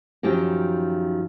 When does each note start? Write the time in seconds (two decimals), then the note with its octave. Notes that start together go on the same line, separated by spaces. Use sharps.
0.23 F#2 D#3 F3 G4